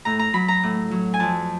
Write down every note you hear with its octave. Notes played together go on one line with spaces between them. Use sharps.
A2 A#5
A#5
F#3 B5
A#5
A2
F#3
G#5
F2 A5